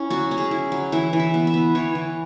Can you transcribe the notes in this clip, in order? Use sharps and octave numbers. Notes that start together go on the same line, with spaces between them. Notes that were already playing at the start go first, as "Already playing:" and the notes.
Already playing: C#4 E4
F#3 F#4
C#4
G#4
E4
F#3
E3 E5
E3
E5
B3
E5
B3
E3 C#5
E3